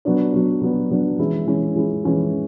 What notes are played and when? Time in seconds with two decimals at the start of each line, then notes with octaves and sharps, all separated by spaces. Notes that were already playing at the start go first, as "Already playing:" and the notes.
0.05 F#3 B3 D4
0.33 F#3 B3 D4
0.62 F#3 B3 D4
0.91 F#3 B3 D4
1.19 E3 G#3 C#4 E4
1.47 E3 G#3 C#4 E4
1.75 E3 G#3 C#4 E4
2.04 E3 G#3 C#4 E4